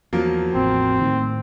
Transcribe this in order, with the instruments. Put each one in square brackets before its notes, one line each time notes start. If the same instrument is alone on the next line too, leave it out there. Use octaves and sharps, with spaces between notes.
[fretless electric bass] E2 [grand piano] F3 F#3 A#3
[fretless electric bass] A1 E2 [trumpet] C4
[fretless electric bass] A2 D#3